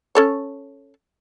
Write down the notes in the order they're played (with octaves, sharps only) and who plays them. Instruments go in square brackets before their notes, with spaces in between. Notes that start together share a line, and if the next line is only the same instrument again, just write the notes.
[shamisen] C#4 A4 C#5